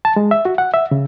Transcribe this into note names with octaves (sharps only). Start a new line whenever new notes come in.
A5
G#3
E5
F#4
F#5
E5
C#3